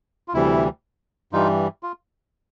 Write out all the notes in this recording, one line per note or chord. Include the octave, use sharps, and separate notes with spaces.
F4
D2 C3 E3 G3 E4
G2 E3 G3 D#4 F4
F4